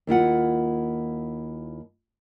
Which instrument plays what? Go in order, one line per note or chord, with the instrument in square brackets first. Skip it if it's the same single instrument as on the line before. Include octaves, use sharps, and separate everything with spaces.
[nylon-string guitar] D#2 E4 F4 F#5